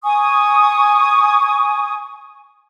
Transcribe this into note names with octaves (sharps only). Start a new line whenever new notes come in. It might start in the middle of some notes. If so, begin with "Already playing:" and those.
G#5 C#6 D#6